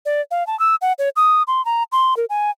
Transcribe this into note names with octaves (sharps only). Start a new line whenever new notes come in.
D5
F5
A5
E6
F#5
C#5
D#6
C6
A#5
C6
A#4
G#5